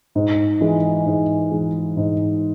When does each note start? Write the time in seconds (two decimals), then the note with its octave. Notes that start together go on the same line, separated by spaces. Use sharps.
0.15 G#2
0.61 E3 G#3
1.06 G#2
1.51 E3 G#3
1.97 G#2